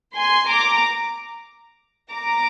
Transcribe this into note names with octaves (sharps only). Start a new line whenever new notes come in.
G#5 C6
A#5 D6
A#5 D6